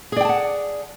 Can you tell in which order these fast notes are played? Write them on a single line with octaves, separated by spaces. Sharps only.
G#4 D5 G5 A5 F#5